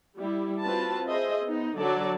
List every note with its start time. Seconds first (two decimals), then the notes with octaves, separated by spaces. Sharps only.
0.17 G3 E4
0.62 C4 F4 F#4 B4 A5
1.07 G#4 C5 D#5 E5
1.43 B3 D#4
1.76 D3 F#3 A4 D5 A5